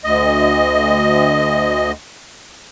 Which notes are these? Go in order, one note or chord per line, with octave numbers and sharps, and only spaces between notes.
D2 D#5